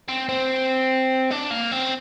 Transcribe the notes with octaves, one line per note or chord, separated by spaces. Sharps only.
C4
C4
D4
A#3
C4